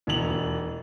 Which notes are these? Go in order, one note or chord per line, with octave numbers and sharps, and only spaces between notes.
E1 D#2 E3 F7 F#7